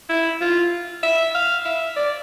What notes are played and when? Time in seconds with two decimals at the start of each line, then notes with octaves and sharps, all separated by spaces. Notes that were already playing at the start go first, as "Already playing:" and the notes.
0.10 E4
0.41 F4
1.03 E5
1.35 F5
1.65 E5
1.97 D5